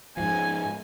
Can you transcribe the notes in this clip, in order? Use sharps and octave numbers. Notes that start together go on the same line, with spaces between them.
G#2 F3 G#5